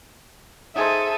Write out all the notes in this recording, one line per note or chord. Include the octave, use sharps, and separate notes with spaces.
D#4 G#4 A4 C5 E5 D#7